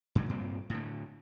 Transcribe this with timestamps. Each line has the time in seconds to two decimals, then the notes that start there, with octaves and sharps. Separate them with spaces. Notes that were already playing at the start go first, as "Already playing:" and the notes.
0.15 G#2 D3 F#3 G3
0.29 G2 A#2 C4
0.70 A2 D3